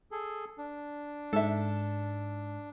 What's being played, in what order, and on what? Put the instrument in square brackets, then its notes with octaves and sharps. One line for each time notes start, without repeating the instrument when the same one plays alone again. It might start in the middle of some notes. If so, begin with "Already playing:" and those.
[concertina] G#4 A4
D4
[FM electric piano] G#2 [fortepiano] A4 E5